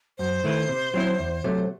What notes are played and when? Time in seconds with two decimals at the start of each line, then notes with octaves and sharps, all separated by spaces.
0.18 F#2 C5
0.44 D#3 A3 E4 B4
0.69 C3
0.94 F#3 C4 E4
1.19 E2
1.44 C3 F#3 A3